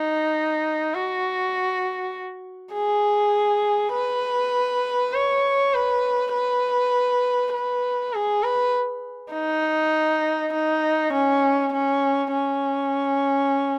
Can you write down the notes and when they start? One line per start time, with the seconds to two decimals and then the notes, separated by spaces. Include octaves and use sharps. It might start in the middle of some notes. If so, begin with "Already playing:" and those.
Already playing: D#4
0.94 F#4
2.73 G#4
3.94 B4
5.14 C#5
5.74 B4
6.33 B4
7.54 B4
8.13 G#4
8.43 B4
9.33 D#4
10.53 D#4
11.13 C#4
11.73 C#4
12.33 C#4